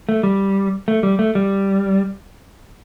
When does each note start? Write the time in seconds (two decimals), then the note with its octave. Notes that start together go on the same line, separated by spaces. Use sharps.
0.09 A3
0.23 G3
0.88 A3
1.03 G3
1.19 A3
1.35 G3